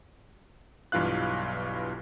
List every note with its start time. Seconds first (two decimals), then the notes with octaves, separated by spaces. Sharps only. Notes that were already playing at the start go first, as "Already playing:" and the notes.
0.92 B1 G2 E3 F4 F5 F#6